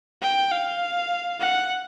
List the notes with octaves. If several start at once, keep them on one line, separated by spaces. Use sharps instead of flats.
G5
F5
F#5